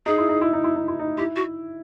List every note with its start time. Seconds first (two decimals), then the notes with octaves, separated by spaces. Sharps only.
0.06 D#4 G#4
0.18 E4
0.29 D#4
0.41 E4
0.53 D#4
0.64 E4
0.76 D#4
0.88 E4
0.99 D#4
1.17 E4 G4
1.36 F#4